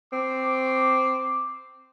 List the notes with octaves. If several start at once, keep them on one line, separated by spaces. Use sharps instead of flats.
C4 D6